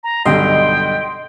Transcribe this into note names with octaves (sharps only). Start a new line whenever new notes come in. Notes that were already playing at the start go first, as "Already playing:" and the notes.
A#5
B1 G2 D3 D#5 G5 C6